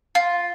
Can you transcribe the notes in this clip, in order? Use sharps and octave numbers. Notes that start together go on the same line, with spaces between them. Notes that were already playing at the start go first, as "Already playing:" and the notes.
F4